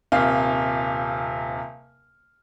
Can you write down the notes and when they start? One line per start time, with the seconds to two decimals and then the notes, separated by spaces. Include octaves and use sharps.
0.12 D#1 C3 F5